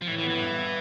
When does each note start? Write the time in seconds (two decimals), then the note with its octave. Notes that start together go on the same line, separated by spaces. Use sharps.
0.02 F3
0.07 A2 E3
0.18 E3
0.24 B3
0.30 E3
0.41 G2
0.56 B3